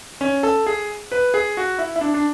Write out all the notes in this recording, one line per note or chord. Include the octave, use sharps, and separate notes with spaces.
C#4
A4
G#4
B4
G#4
F#4
E4
E4
D4
D4